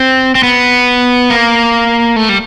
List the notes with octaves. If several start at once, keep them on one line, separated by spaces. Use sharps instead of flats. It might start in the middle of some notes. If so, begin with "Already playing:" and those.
Already playing: C4
C4
B3
A#3
A3
G3